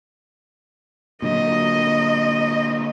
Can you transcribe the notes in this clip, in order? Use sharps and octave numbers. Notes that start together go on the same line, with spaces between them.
A#2 D3 F#3 D#5